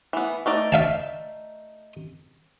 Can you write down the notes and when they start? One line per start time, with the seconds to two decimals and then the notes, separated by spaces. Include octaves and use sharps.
0.13 E3 B3
0.46 A3 D#4 D5
0.72 E5 F5 A5